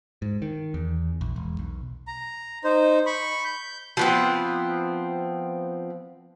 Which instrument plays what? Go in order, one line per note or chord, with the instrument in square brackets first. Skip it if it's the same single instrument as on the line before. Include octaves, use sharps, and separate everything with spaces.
[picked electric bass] G#2
D#3
E2
A#1
E1
B1
[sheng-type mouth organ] A#5
D#4 C5
B5 C#6
G6
[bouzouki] F3 B3 C4